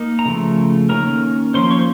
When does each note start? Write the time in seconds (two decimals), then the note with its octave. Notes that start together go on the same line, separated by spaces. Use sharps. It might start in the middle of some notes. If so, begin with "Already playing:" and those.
Already playing: A#3 D#4 D#5
0.19 A#5
0.26 C#3 F3 A3
0.89 D#3 A#3 C#4 A#4 A#5
1.54 F3 A#3 C#4 C5 C6
1.71 C#5 C#6
1.78 C5